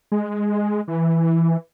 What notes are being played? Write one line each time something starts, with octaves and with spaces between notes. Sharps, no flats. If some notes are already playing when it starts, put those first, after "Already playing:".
G#3
E3